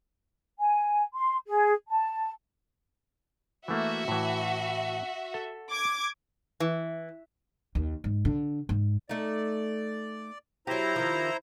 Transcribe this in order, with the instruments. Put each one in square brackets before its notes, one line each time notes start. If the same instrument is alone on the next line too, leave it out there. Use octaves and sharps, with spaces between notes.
[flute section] G#5
C6
G#4
A5
[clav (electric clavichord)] E3 A3 A#3 [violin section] F#4 E5
[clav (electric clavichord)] A2 E3
A4
[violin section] D6 G#6
[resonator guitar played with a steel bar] E3
[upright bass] D#2
G#2
D3
G#2
[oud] A3 D#4 [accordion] D5
[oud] F#3 G4 [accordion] E4 C5 A#5
[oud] D#3 F3